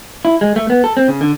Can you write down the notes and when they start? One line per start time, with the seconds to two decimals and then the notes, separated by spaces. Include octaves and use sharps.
0.25 E4
0.41 G#3
0.56 A3
0.70 B3
0.84 A4
0.97 C4
1.08 C#3
1.21 D3